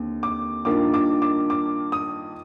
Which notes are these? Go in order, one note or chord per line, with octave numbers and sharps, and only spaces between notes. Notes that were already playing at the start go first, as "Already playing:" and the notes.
Already playing: D#2 D3 C4
D6
G2 D#3 A#3 D4 F4 D6
D6
D6
D6
D#6